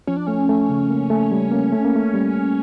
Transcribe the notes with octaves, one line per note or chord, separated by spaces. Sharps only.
F3 C#4
D4
A3 C#4
A3
C#3
A#3
A3
G3
A#3
A3
A#3
A3
G3